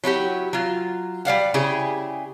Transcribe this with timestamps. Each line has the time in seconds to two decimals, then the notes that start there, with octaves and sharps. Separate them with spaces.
0.04 F#3 E4 F#4 G4
0.53 F#3 F4
1.25 G3 D5 F5 F#5
1.54 C#3 E4 G4 G#4